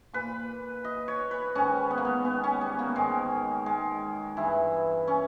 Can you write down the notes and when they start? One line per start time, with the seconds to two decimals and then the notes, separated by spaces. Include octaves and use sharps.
0.14 A#2 B4
0.84 D#5
1.08 C#5
1.31 B4
1.55 G#2 D#3 C#4
1.91 B3
1.98 A#3
2.05 B3
2.25 B3
2.44 C#4
2.61 G3
2.79 A#3
2.95 G#2 D#3 G#3
3.66 G#3
4.37 G2 E3 E4
5.08 C#4